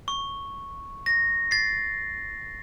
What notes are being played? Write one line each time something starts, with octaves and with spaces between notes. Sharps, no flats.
C#6
A#6
A6 C7